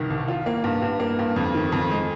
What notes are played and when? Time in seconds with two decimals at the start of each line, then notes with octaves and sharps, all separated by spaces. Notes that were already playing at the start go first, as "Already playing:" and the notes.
Already playing: C2 G2 D#3
0.10 C2
0.28 F4
0.46 A#3
0.64 G2
0.82 G2
1.00 A#3
1.19 G2
1.36 F2
1.54 D#3
1.72 F2
1.91 G#3